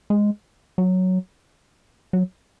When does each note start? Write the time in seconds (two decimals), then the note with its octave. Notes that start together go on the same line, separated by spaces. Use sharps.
0.10 G#3
0.78 F#3
2.13 F#3